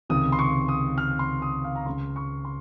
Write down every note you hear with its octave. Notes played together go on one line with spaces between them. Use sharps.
C#2 C3 D#3 D#6
C6
C#6
D#6
F6
C6
D#6
F5
A#5
C#2 C#3 C6
C#6
C6